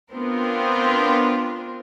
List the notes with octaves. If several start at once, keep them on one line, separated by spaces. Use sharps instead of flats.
B3 C4 D4 F4 A#4 C5